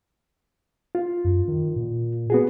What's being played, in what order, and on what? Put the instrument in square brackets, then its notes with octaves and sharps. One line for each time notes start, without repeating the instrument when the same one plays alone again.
[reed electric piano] F4
[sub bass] F#2
D#3
A#2
[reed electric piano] B3 F#4 G#4